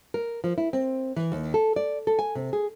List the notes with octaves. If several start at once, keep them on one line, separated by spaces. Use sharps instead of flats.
A#4
F3
E4
C4
E3
D#2
A4
D5
A4
G#5
C3
G#4